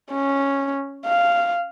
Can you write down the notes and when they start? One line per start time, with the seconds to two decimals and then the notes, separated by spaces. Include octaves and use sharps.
0.12 C#4
1.06 F5